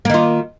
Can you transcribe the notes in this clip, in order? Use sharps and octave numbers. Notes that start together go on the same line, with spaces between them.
D#3 A#3 F4